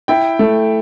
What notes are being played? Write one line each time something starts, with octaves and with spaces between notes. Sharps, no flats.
E4 G5
A3